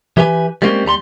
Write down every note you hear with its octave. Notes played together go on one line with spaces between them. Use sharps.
E3 G4 B4 G#5
G3 G#3 A#3 C4 C#4 G4
D#2 G3 A#5 C6